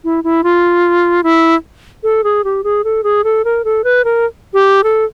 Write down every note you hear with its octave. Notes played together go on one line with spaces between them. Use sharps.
E4
E4
F4
E4
A4
G#4
G4
G#4
A4
G#4
A4
A#4
A4
B4
A#4
G4
A4